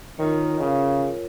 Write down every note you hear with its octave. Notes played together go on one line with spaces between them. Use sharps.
D#3 F4 A#4 C#5
C#3